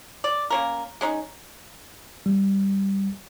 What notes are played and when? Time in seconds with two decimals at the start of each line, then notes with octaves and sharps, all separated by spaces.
0.24 D5
0.50 A#3 C#4 A#4
1.01 G#3 C#4 D#4
2.26 G3